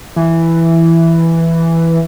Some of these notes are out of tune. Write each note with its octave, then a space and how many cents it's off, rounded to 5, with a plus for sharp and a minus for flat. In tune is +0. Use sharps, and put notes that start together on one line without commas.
E3 +5